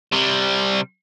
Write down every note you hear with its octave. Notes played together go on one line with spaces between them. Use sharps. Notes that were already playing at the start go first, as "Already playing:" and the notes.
C3 G3